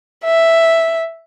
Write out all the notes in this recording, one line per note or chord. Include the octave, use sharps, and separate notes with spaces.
E5